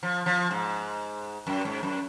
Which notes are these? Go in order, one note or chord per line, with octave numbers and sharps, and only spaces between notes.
F3
F3
G#2
F#2
G#2
F#2